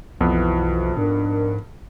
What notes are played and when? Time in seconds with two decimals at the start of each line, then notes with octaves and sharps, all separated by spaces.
0.21 B1 F2 B2 E3 F3 B3
0.97 G#2 D4 A#4